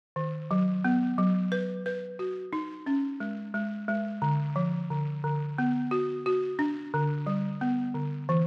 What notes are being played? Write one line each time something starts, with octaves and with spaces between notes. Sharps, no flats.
D#3
F#3
B3
F#3
B4
B4
F#4
D#4
C#4
G#3
G#3
G#3
D3
F3
D3
D3
B3
F#4
F#4
D4
D3
G3
B3
D3
E3